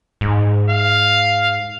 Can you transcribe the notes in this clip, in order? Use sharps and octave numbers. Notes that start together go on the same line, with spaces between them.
G#2
F5